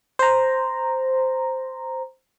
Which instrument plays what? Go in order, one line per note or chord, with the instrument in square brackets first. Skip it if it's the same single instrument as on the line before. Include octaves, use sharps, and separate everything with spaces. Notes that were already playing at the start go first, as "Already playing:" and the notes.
[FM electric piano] C5 A#5